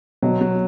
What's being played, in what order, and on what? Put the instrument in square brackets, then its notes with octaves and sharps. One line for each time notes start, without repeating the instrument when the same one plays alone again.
[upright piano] B2 [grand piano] F#3
[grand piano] F#3